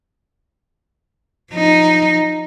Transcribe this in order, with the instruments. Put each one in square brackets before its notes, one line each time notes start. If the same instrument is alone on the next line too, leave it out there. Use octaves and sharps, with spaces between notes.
[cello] F3 D#4